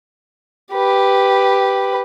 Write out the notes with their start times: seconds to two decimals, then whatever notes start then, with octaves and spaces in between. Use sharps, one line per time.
0.73 G4 B4